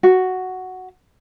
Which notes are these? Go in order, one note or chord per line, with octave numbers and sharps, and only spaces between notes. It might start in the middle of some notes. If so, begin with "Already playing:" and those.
F#4